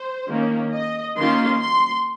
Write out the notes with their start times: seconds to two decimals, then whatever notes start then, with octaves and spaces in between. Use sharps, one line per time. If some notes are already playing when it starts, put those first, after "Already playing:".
Already playing: C5
0.29 D#3 A#3 C#4
0.73 D#5
1.17 D#3 A#3 C#4 F4 C6
1.61 C6